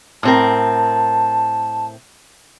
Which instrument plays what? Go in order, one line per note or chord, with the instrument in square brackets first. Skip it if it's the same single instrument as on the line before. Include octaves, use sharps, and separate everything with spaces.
[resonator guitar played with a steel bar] A2 C4 A#4 [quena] A5